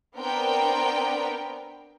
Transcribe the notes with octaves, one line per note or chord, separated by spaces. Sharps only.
B3 C4 D4 A#4 G5